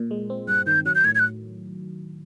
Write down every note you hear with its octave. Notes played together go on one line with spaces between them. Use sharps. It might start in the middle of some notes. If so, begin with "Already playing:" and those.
Already playing: A#2
G#3
C4
G2 F#6
D#3 G6
F#3 F#6
G6
A2 G#6
G#6
F#6